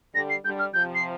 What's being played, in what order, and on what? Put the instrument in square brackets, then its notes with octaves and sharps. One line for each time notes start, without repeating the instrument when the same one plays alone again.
[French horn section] D3 G3 [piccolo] A#6
[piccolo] C7
[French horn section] D3 G3 [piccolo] G6
[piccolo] F6
[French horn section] C3 F3 [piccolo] G6
[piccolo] C7